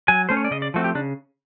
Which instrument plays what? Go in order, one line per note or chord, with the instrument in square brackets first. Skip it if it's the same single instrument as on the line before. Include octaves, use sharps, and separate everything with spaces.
[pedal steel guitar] F#3 G#5
A3 C#4 C5
C#5
D5
C#3 D#5
D5
F3 A3 C4 F#4
G4
C#3 D4